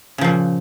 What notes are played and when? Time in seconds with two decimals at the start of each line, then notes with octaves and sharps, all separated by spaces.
0.18 C#3
0.21 F3
0.24 A#2